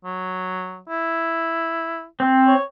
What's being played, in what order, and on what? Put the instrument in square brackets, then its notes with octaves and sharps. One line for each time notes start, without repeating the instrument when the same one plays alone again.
[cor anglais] F#3
E4
[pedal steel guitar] C4
[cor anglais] C#5